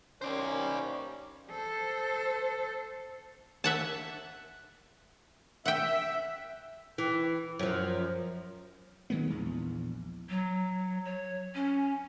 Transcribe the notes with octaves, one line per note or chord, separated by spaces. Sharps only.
D#2 D#3 C#4 C5 D5
A4 C5
E5 F#5 A5
E5 F#5 G5
E3
F#2 F3
D#3 G#3 B3
A#1 E2
F#3
C#5
C#4